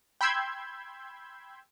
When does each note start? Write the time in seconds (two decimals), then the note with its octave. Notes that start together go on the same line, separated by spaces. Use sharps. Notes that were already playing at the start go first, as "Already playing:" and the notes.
0.21 G5 B5 C6 E6 G6 G#6